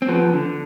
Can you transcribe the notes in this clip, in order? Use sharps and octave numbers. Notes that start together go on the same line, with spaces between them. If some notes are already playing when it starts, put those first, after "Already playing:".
C4
F3 B3
D3